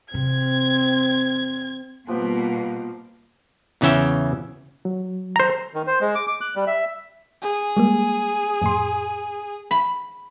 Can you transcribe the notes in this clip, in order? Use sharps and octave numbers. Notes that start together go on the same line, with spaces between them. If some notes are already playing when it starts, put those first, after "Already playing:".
E2 C3 C4 G#6
B2 F3 G3 A#3 B3 G4
E2 C#3 E3 C#4 E5 G5
F#3
C5 A#5
D#3
C5
G#3
D6
D6
F#6
G3
E5
G#4
G3 G#3 A#3
F2 A2 C6
B5